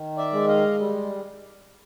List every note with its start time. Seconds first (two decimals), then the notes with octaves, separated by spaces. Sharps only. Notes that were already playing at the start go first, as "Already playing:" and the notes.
Already playing: D#3
0.17 D5 E5
0.33 G#3
0.48 D#5 F5
0.79 G3